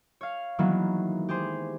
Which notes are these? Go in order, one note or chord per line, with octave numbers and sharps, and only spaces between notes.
C#5 F5
D#3 E3 F#3 G#3 A#3 B3
G4 G#4 C5